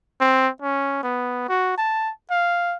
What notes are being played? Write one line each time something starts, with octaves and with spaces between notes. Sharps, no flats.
C4
C#4
B3
F#4
A5
F5